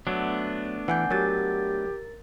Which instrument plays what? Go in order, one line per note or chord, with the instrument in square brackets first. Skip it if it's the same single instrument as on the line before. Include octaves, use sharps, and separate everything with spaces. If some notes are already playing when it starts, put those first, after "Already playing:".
[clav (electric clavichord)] F#3 [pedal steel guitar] A3 B3 D4
[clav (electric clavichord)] E3 [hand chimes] F#5 G#5 G6
[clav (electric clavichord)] F#3 [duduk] G4 [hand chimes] A#4 A6